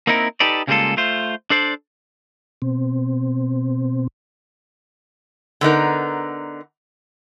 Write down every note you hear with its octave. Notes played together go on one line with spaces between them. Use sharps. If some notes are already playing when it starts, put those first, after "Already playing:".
A#3 C4 D#4 E4 A#4
D#4 G4 A4 B4 D5
C#3 G3 G#3 A#3 F4 A4
A3 F4 C5
D4 A4 C5 D5
B2 C4
D3 B3 D#4 A#4